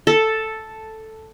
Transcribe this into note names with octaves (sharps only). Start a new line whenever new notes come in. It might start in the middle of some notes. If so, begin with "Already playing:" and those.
A4